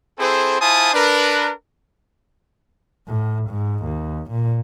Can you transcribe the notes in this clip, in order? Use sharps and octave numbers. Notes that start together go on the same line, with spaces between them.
C4 E4 G#4 A4 C5
E4 F4 C5 G#5 A5 D#6
D4 A#4 B4
A2
G#2
D#2
A#2